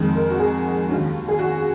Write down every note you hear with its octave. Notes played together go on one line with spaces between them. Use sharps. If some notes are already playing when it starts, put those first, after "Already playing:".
Already playing: F2 D#3 G#3
A#4
F#4
G#4
D#2 C#3 F#3
G#4
F#4